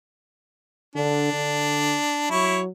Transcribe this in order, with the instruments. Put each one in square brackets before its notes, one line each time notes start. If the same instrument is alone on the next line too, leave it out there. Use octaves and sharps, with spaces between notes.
[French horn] D3 [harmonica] D4
[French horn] D3
[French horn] F#3 [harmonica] E4 C#5